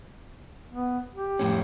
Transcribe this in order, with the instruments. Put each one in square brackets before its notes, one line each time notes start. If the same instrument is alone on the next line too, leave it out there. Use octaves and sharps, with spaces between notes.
[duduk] B3
G4
[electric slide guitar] F2 A2 C#4